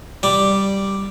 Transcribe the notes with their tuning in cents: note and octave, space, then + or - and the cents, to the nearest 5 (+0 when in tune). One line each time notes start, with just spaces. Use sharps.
G3 +0 D5 +0